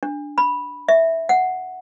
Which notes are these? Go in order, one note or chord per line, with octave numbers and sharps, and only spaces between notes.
D4
B5
E5
F#5